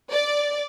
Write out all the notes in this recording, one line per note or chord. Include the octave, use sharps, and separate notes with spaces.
D5